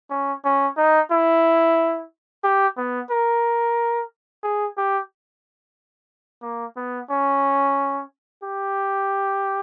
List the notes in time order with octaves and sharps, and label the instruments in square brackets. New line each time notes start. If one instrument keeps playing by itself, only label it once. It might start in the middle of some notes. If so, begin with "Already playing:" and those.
[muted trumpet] C#4
C#4
D#4
E4
G4
B3
A#4
G#4
G4
A#3
B3
C#4
G4